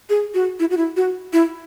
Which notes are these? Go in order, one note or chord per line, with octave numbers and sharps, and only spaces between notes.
G#4
F#4
E4
F#4
E4
F#4
E4